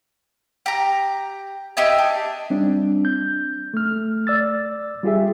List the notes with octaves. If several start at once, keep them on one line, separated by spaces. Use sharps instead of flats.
G4 A#5
D#4 G4 E5 G#5
D4
G3 C4 D4
G6
A3 F6
D5 E6 A6
G3 F4 G4 G#4 E5